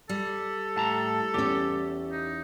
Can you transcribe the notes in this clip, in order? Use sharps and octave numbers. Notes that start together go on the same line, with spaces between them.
G3 A4
A2 A5 A#5
E2 C#4 G4
D#4